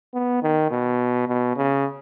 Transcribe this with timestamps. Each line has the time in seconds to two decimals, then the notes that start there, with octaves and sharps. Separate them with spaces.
0.14 B3
0.42 D#3
0.71 B2
1.28 B2
1.56 C#3